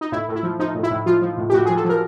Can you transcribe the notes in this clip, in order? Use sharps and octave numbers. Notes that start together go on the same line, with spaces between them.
D#4
A2 E4
A2
E4
F3
F3 D#4
A2
E4
A2
F3 F4
F3
A2
G4
A2 F#4
F3 G#4
A4
F3 A#4